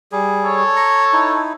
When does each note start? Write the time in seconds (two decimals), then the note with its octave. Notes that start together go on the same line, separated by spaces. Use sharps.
0.12 G3 G#4
0.45 A4 C#5
0.76 A#5 C#6
1.13 D#4 E4